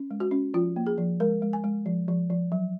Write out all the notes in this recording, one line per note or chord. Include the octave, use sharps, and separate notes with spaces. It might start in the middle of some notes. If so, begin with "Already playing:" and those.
Already playing: C#4
G#3
F#4
C#4
F3 F4
A#3
G#4
F3
G#3 A#4
G#3
G#5
G#3
F3
F3
F3
F#3